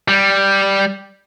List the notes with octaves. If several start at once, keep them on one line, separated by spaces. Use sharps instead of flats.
G3